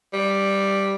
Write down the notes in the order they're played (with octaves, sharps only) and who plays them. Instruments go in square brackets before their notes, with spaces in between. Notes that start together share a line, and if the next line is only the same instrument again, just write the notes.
[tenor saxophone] G3